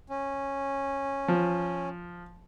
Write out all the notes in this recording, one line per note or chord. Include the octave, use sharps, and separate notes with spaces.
C#4
F3